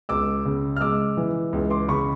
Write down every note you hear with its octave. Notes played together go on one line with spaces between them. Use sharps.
C#2 D6 E6
C#3
F6
G#3 D6 E6
E3
C#2
C6 D6
C#3 B5 C#6